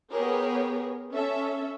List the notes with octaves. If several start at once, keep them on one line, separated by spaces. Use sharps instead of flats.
B3 G4 G#4 A#4 C#5
C#4 A4 E5